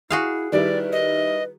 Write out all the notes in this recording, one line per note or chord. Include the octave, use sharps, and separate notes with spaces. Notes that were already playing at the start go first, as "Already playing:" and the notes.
E4 F#4 G#4 F5
D#3 G3 E4 B4 D5
D#5